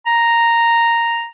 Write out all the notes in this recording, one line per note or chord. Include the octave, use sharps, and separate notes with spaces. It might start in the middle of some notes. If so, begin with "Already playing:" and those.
A#5